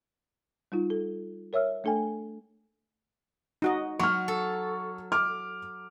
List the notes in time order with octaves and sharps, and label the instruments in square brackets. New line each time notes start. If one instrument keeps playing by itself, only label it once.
[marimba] G3 D#4 F4
A4
A#4 C#5 E5 E6 F6
A3 D4 A4 G5 G#5
[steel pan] D#4 F#4 D#5
[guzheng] F#3 [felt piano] C#6 F6
[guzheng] A4
[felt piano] D6 F6